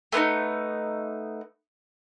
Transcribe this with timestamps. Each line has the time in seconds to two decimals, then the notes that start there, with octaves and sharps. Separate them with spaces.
0.12 A3 B3 D4 D#4